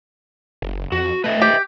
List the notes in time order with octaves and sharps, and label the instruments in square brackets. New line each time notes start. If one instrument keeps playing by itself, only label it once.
[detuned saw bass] F#1
[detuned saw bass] F2 [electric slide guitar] F#4
[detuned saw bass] A3 [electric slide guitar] B4 D#5 E5
[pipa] G4